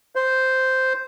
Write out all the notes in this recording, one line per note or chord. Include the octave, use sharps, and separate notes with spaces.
C5